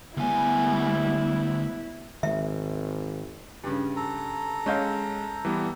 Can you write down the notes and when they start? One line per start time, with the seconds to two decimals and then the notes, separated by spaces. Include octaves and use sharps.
0.17 D2 G3 G#3 B3 E4 G#5
2.23 G#1 D#3 G#3 E5
3.64 G2 C#3
3.96 A4 A#5
4.66 G#3 C#4 D#5 F5 G6
5.45 E3 G3 B3